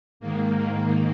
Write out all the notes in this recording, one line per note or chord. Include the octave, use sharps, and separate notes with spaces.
G#2 D#3 A#3